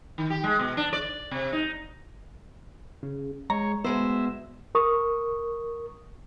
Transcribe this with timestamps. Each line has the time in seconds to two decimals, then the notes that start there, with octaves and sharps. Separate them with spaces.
0.18 D#3
0.30 G4
0.44 G#3
0.59 B2
0.77 D4
0.93 D5
1.31 C3
1.52 D#4
3.03 C#3
3.50 G#3 C#5 A#5
3.84 D2 G#3 B3 C5 E5
4.75 A#4 C#6 D#6